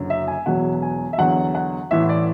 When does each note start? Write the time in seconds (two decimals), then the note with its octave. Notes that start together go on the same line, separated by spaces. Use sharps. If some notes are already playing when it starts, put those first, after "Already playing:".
Already playing: F#1 F#2 D3 F#3
0.10 E5
0.28 G#5
0.46 E1 E2 B2 F#3 F#5
0.82 G#5
1.13 E5
1.18 E2 D3 F#3 F#5
1.55 F#5
1.91 A1 A2 E3 E5
2.09 D5